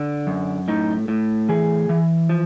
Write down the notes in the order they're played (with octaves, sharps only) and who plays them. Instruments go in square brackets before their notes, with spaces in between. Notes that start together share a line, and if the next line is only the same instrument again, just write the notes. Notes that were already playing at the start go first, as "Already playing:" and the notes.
Already playing: [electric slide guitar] D3
F#2
A2 D#4
A2
E3 G#4
E3
F3